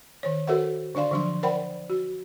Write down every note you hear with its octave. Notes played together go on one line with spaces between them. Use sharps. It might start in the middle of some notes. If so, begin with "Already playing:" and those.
D#3 C5 C#5
F#4 A4 A#4 C5 E5 F#5
D3 D4 D5 F5 C6
D3 F3 F#3 D4 C6
A#4 C5 D5 F#5 G5 B5
F#4